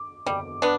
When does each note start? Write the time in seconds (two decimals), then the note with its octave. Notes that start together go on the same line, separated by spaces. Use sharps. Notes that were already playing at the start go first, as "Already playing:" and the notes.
Already playing: D6
0.26 G3 D6
0.62 B3 D4